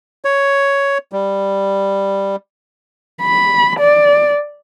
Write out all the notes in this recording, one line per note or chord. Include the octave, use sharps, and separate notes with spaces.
C#5
G3
B5
D5